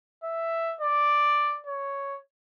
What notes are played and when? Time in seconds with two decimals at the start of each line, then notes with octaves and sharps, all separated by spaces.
0.24 E5
0.81 D5
1.67 C#5